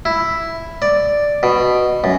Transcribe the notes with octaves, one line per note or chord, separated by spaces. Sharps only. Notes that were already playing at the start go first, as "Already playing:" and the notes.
E4
D5
B2
F#2